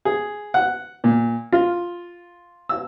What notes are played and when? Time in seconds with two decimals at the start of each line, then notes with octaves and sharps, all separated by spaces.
0.05 G#4
0.54 F#5
1.04 A#2
1.52 F4
2.69 E6